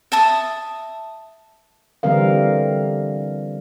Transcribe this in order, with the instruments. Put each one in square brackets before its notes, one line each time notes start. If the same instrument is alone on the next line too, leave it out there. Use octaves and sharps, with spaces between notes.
[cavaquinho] E5 A5 D#6
[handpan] D3 E3 G3 C4 A#4 F5